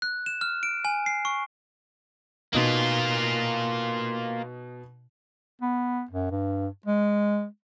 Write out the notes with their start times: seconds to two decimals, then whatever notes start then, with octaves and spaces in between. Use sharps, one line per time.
0.02 F#6
0.26 E7
0.41 F6
0.63 D7
0.85 G#5
1.06 C7
1.25 C#6
2.53 B2 A#3 D#4 F4 F#7
5.61 B3
6.11 F#2
6.31 G2
6.85 G#3